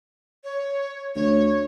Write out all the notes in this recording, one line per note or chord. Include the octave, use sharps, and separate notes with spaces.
C#5
D2 C#5